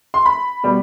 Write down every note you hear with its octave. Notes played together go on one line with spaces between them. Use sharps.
C6
B5
B2 G3